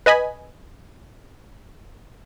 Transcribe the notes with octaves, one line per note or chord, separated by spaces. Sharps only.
B4 D#5 G#5 B5